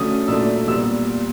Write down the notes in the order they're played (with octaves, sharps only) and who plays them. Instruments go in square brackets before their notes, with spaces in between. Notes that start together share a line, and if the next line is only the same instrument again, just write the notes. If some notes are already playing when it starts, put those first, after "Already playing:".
Already playing: [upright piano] D3 F#3 A3 C#4 D#6
A#2 F#3 A3 D4 E6
A#2 G3 B3 E6